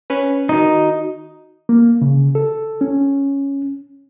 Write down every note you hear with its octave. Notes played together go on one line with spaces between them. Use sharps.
C#4 B4
D#3 D#4 F#4
A#3
C#3
A4
C#4